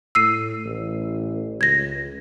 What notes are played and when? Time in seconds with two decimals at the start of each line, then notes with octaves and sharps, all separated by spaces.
0.15 A2 E6 C7 D#7
0.66 A1
1.61 C#2 G#6 A#6